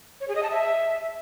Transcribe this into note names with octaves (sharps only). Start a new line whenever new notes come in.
C#5
G#4
D#5
A5
E5